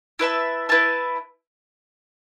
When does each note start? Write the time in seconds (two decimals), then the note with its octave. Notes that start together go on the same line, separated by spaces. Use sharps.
0.19 E4 B4 E5 A5
0.69 E4 B4 E5 A5